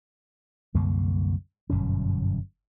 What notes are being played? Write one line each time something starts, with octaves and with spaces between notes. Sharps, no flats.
C2 F#2 D3 A#3
G1 F#2 B2 C#4